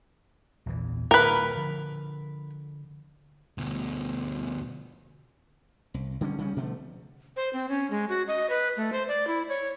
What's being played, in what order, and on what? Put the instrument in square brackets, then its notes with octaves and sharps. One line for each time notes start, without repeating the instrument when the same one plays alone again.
[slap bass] A#1 E2 E3
[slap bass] D1 A2 [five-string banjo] A#4 B4
[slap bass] D3 F3
[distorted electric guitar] D2 B2
[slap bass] C2
D3 G3 A#3 C#4
C#3 G3 C#4
B2 D3 F3 A3
[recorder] C5
C4
C#4
G#3
F#4
D#5
B4
A3
C5
D5
E4
C#5